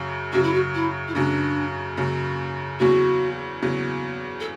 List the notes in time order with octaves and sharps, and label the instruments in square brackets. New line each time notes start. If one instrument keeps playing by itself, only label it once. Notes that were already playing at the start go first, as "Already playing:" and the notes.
Already playing: [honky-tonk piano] F#2 C#3 F#3
[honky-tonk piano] F#2 C#3 F#3 [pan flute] F#4
[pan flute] E4
F#4
E4
E4
[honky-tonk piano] F#2 C#3 F#3 [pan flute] D4
[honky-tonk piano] F#2 C#3 F#3
[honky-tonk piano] E2 C#3 F#3 [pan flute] F#4
[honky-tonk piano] E2 C#3 F#3
[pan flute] A4